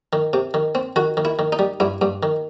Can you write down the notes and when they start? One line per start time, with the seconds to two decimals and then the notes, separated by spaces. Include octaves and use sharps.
0.13 D#3
0.33 C3
0.54 D#3
0.75 C4
0.96 D#3 F#4
1.17 D#3
1.25 E4
1.39 D#3
1.52 D#4
1.59 G3
1.80 G2 E4
2.01 G2
2.23 D#3